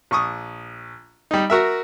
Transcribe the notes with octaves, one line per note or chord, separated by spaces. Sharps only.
A#1 C#6 D#6
G3 D#4
F#4 A#4 E5